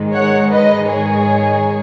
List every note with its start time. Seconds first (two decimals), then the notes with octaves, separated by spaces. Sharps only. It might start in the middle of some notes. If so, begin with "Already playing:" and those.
Already playing: G#2 D#3 G#3
0.15 C#5 F#5
0.51 B4 D#5
0.88 G#4 C#5